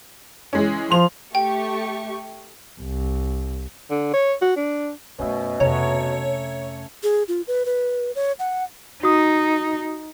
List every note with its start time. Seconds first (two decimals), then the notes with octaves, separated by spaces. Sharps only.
0.53 E3 G#3 C#4
0.91 F3 C6 F7
1.35 A3 G4 G5 C#6
2.80 C2
3.91 D3
4.13 C#5
4.42 F#4
4.56 D4
5.19 F#2 B2 A3 C#4 E5
5.60 F2 C3 A3 C#5 A#5
7.03 G#4
7.28 F4
7.47 B4
7.66 B4
8.15 C#5
8.39 F#5
9.03 D#4 F#4 D#6